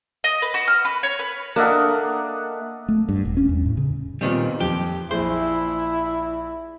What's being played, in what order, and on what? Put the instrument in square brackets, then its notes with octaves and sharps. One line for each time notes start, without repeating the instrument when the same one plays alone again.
[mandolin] D#5
B4
F#4
F6
B4
C#5
B4
[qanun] A#3 [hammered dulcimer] D4 A#4 E5 [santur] A4 D#5 F#5
[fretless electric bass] A3
G2
E1
C#4
E2
A2
C#3
[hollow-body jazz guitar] A#2 D#3 G3 [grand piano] B3 C4
[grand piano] F2 [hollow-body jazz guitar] G4
[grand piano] A#1 G#4 [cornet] E4 [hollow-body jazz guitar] C5